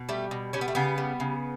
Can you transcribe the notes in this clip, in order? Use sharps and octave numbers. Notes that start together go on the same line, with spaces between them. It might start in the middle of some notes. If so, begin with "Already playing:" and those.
Already playing: B2
G3 A3
B2
G3 C#4
B3
A3
C#3 B3
G3
C#3